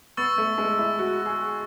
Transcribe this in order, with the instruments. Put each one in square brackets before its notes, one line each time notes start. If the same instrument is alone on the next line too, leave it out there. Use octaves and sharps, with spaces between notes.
[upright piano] B3 [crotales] C#6 E6 A6
[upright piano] A3
G#3
E4
F#4
G#4